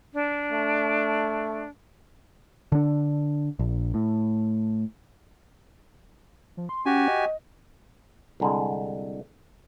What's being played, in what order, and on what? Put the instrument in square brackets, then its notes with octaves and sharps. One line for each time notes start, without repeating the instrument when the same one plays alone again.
[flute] D4
[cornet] A3
[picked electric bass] D3 D4
A#1
A2
[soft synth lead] F3
C6
[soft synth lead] C#4 [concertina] F#4 G4 G#5
[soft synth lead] D#5
[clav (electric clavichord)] C2 D3 G#3